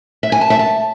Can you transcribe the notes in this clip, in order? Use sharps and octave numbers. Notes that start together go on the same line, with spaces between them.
E5
G#5
A5
E5
A5